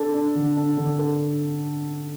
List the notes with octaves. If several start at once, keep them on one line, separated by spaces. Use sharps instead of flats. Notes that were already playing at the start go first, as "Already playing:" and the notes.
Already playing: D4 A4
D4
D3
D4
D3
A4